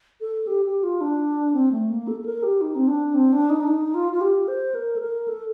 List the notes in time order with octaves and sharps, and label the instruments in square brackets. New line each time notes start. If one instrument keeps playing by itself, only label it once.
[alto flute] A4
G4
G4
F4
D4
C4
A3
A#3
A4
A4
A#4
G4
D#4
C4
D4
C4
D4
D#4
D4
D#4
F4
F4
G4
C5
A#4
A4
A#4
A4